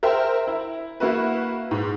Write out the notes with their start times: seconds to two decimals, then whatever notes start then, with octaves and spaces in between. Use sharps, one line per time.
0.03 A#4 C5 E5 G5
0.47 E4
1.00 A#3 E4 F#4 B4
1.71 G#2